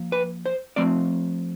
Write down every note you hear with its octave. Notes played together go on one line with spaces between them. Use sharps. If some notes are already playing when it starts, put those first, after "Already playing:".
Already playing: F3 A#3
B4
C5
F3 A3 C4 D5